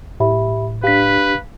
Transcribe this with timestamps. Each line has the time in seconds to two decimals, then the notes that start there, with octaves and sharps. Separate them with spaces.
0.20 A2 G4 E5 B5
0.84 D4 G4 B4 F5 B6